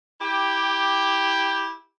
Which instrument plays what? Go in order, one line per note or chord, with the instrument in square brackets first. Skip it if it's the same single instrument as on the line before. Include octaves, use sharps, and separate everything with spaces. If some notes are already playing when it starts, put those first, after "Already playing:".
[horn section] E4 G4